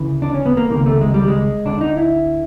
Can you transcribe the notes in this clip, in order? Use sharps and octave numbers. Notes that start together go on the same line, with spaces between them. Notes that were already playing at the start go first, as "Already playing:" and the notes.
Already playing: D2 C#3 E3
D4
C#4
B3
A#3
C#2 C3 D#3 A#3
A3
G#3
G3
G#3
D2 D3 D4
D#4
E4